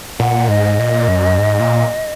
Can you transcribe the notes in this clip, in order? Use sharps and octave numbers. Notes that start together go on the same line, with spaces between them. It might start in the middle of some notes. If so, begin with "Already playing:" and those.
A#2 F#5
G#2 D#5
A#2
F#2
G#2
A#2